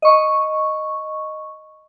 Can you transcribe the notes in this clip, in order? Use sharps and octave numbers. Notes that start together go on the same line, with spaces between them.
D#5 C#6